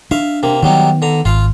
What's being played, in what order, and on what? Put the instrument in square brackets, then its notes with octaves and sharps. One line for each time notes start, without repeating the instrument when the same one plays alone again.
[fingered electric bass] D4 [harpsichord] E5 F5
[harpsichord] C3 A#3
[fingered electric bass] D#3 B3 [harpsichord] F#3 G3 D#4
[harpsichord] D3 A#5
[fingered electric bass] G#1 [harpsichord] F4 F5